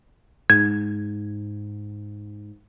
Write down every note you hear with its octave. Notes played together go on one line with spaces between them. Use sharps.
G#2 G#6